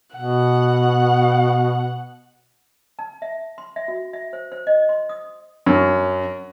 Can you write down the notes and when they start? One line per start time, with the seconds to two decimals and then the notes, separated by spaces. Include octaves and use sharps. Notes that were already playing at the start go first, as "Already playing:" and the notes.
0.16 B2 F#5
2.99 A5
3.22 E5
3.58 C6
3.76 E5
3.88 F#4
4.13 E5
4.33 C5
4.52 C5
4.67 D#5
4.89 C6
5.09 D#6
5.66 F#2